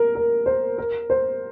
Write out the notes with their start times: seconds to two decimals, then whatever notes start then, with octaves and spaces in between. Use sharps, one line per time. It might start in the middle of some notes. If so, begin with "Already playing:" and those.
Already playing: A#4
0.15 A#4
0.46 C5
0.78 A#4
1.10 C5